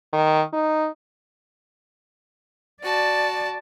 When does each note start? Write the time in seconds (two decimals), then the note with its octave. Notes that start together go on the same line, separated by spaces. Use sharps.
0.13 D#3
0.53 D#4
2.83 F#4 D5 A5